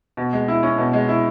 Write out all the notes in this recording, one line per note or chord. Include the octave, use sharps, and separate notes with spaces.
B2
G#3
E4
C#4
B2
G#3
E4